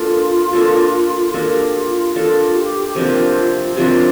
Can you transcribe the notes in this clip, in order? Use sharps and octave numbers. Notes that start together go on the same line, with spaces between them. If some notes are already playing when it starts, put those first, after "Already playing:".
Already playing: A#3 D4 F4 A4
A#3 D4 A4
A#3 D4 F4 A4
G4
F4
F4
A#3 D4 F4 A4
G4
C3 F3 A#3 D4 F4
C3 F3 A#3 D4 F4